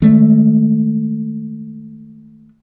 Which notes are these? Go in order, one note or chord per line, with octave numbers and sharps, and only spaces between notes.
D#3 G#3 A3